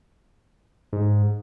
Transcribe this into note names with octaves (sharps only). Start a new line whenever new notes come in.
G#2